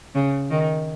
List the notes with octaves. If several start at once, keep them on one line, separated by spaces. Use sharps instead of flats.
C#3
D#3